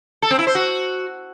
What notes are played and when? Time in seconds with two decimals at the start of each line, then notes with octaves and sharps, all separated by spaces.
0.22 A4
0.31 C4
0.39 E4
0.47 C5
0.55 F#4